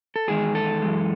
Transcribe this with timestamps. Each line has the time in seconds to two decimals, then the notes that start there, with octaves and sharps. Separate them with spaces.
0.16 A4
0.28 E2 D#3 G#3 G#4
0.55 A4
0.82 F#2 E3 G#3